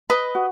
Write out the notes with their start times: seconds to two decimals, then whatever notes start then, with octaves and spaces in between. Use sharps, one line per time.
0.10 B4 D#5 B5
0.35 F#4